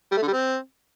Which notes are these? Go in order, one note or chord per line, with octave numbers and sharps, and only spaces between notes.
G3
A3
D3
G3
C4